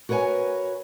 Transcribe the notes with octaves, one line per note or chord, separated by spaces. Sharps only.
F#4 A#4 B4 C#5 G#5